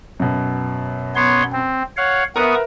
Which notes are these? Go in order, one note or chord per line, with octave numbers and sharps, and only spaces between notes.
F#2 B2
B3 C#5 C6
C4
C#5 F5 F#5
B3 A#4 B4 E5 C#6 D#6